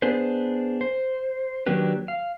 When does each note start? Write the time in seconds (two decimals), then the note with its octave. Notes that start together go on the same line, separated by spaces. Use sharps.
0.02 B3 D4 G#4 B4 C5
0.81 C5
1.66 D#3 F#3 A#3 D4 G4 B4
2.08 F5